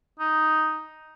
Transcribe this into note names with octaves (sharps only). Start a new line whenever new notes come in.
D#4